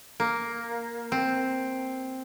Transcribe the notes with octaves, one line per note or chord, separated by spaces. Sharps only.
A#3
C4